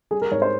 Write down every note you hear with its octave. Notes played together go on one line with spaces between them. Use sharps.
G3 G#4
A#4
G#2 C#5
C5